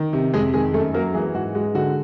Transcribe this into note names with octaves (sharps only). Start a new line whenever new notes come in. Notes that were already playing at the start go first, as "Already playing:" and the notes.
Already playing: D#3
C3
F2 G#3 G#4
D#3 G#3 G#4
F#2 A3 A4
F#3 A#3 A#4
E3 G#3 G#4
G#2 F#4
G#3 F#4
D3 F#4